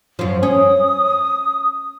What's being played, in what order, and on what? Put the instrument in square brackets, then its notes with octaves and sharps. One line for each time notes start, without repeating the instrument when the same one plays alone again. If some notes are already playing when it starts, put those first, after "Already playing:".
[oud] F#2 F3
[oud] C#4 [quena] D#6